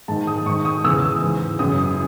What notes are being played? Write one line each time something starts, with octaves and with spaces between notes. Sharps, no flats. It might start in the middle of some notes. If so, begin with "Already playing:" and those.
G#2 D#3 A5
D#6
G#2 D#3 C#6
D#6
E2 C#3 E3 E6
G#2 E3
F#2 C#3 E3 D#6
D#6